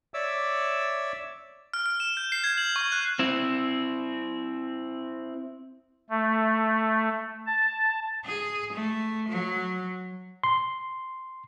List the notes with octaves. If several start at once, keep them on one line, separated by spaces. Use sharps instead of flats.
C#5 D5 E5 D6 E6
F6
F6
E7
G6
C7
G#6
F#7
C#6
F#6
C4 E4
A3
A5
G#4
A3
F#3
C6